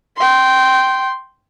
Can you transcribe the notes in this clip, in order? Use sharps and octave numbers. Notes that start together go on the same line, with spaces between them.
G5 C6